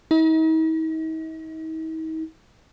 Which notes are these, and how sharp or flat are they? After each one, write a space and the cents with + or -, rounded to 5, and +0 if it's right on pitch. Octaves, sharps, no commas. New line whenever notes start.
D#4 +45